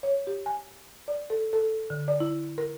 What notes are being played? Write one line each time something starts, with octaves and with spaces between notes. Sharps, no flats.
C#5
G4
G#5
D5
A4
A4
D3
D5
E4
A#4